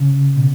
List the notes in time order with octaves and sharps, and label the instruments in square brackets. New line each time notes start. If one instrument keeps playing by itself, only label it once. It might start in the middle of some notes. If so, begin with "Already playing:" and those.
Already playing: [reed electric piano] C#3
B2